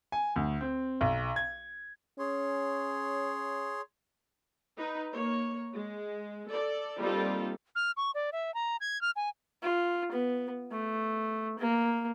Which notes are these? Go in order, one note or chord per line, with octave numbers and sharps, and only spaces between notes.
G#5
D2
C4
B1
G#6
C#4 G#4 C#5 C6
D#4 B4
A#3 C#5
G#3
A4 D5
G3 A#3 C4 D#4 F4 A4
F6
C#6
D5
E5
A#5
G#6
F6
G#5
F4
B3
A3
A#3